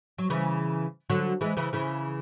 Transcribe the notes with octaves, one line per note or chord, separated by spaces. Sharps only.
F#3
C#3 E3
D3 F#3
E3 G#3
C#3 E3
C#3 E3